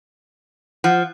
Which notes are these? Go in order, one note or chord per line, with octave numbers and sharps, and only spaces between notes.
F3 F#5